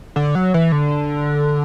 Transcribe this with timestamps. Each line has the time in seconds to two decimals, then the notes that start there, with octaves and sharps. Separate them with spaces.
0.16 D3
0.35 F#3
0.54 E3
0.72 D3